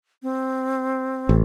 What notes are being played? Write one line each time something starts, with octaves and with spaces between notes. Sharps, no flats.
C4
A1